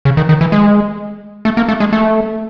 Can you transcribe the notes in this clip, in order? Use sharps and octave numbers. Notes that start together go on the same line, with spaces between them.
C#3
D#3
D#3
E3
G#3
A3
A#3
A3
G#3
A3